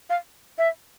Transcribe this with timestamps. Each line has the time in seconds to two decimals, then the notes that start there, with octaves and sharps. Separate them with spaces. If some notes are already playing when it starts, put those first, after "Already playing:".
0.10 F5
0.58 E5